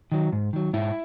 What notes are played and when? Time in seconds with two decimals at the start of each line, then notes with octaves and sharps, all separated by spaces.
0.12 D#3 F#3
0.32 G#2
0.53 D#3 F#3
0.73 G#2 E4